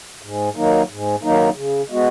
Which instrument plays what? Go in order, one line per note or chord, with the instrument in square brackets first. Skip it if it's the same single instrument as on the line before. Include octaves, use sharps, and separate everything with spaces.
[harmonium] G#2
D#3 F#3 A#3 D#4
G#2
D#3 F#3 A#3 D#4
C#3
G#3 B3 F#4